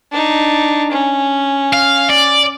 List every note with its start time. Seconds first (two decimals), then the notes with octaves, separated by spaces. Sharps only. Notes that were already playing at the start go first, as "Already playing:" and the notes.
0.12 D4 D#4
0.92 C#4
1.73 F5
2.10 D5